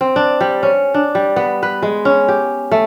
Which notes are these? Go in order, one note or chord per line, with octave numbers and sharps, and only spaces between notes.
C4
D4
G3
C#4
D4
G3
B3
B4
G#3
C#4
G4
A3